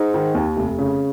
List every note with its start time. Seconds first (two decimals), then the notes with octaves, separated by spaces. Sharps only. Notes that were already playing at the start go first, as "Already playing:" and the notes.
Already playing: G#2 D#4
0.14 D#3
0.35 D#2
0.57 F1
0.79 C#3